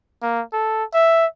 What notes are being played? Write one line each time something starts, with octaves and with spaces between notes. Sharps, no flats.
A#3
A4
E5